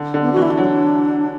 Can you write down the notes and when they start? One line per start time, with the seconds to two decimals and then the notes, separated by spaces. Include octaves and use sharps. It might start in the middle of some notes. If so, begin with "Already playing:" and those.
Already playing: D3
0.14 D3
0.21 B3
0.32 E3 F#4
0.42 E4
0.50 D4
0.57 F#3